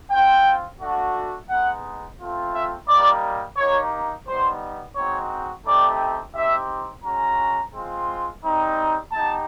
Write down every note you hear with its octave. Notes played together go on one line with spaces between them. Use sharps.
C4 F4 G5
A3 D4 F#4
G#3 B3 D#4 F#5
A3 C4 F4
E5
G3 A#3 D#4 D5
A#3 D#4 G4 C#5
G3 B3 D#4 C5
G#3 C4 D#4 F#4 C#5
A3 C4 D#4 G4 D5
C4 D#4 G4 E5
G#3 C#4 F#4 A#5
G#3 C4 F4
G3 C4 D#4
B3 D#4 G4 A5